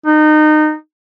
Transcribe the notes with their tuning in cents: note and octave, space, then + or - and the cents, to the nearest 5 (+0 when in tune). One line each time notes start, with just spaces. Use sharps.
D#4 -25